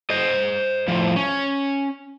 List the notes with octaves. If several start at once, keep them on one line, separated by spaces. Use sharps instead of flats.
C5 D#5
A2 F3
C#4